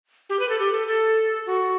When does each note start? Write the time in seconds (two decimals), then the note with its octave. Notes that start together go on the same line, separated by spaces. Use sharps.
0.30 G4
0.40 B4
0.49 A4
0.59 G4
0.73 A4
0.87 A4
1.46 F#4